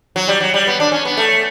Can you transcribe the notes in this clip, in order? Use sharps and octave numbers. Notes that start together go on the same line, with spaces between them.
F#3
G3
F#3
G3
B3
D4
C#4
B3
A3